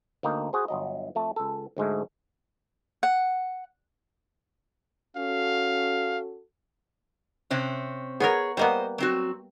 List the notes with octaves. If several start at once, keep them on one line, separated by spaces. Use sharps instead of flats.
D2 A#3 D#4 G5
F#4 G#4 C5
G1 F#3 D#5
F2 A3 A5
C#2 A4
D2 G#2 G#3 A3
F#5
C#4 F#4 A4 F5
C3 C4 C#4
B3 G#4 A#4 C#5
G3 A#3 B3 C5 D#5
F#3 C4 F#4